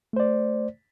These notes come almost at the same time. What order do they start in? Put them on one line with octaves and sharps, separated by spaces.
A3 C5 D5